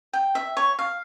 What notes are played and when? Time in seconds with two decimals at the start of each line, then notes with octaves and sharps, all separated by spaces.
0.13 G5
0.35 E5
0.57 C#5
0.79 F5